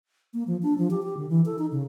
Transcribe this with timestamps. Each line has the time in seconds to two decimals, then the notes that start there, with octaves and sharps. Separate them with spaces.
0.34 A#3
0.47 F3
0.63 D4
0.78 F3
0.91 G4
1.03 G4
1.17 D3
1.29 E3
1.45 A4
1.58 D#4
1.71 C#3